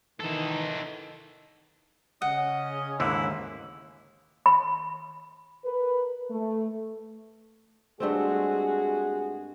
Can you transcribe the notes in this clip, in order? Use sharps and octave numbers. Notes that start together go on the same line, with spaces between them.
D#3 E3 D#4 A4
C#3 C#4 D#5 F#5
D#2 G#2 D3 E4
B5
A#4 B4
A3
G2 G#3 A3 C4 F#4 G#4